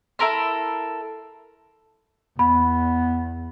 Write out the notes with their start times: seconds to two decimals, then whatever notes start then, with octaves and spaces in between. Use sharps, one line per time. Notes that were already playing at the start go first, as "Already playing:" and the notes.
0.19 E4 A4 A#4 C6
2.39 E2 B3 B5